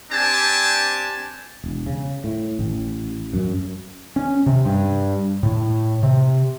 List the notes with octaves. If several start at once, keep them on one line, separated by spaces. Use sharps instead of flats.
C4 D4 G4 G#5 A5
E1
C#3
A2
A1
F#2
C#4
C3
G2
A2
C3